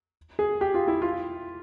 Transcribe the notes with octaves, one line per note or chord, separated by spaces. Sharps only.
G#4
G4
F4
E4
F4